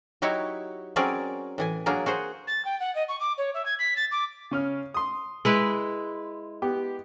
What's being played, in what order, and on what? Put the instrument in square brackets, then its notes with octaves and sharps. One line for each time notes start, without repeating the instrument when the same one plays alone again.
[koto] F#3 D#4 E4 F#4 G4 C#5
F#3 C4 C#4 G#4 A#4 D5
A2 E3 G#5
F#3 A#3 D4 G#4 A#4
F#4 G#4 C5
[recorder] A6
G5
F#5
D#5
C#6
D6
C#5
E5
G#6
B6
A6
D6
[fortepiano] C#3 C#4 F6
C6 D#6
[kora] G#3 E4 B4
[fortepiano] B3 G4